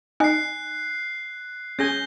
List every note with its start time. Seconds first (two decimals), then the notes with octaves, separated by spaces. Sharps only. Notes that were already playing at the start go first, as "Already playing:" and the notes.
0.20 D#4 G#5 F#6 C7
1.79 C#4 G#4 G#5 G6 A#6 G7